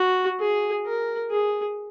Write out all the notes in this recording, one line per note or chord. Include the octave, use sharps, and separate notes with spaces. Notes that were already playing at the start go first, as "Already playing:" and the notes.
Already playing: F#4
G#4
A#4
G#4